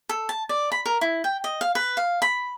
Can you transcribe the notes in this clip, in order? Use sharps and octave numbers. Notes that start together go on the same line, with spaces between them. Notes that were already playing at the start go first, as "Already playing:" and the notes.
A4
A5
D5
B5
A#4
E4
G5
D#5
F5
B4
F5
B5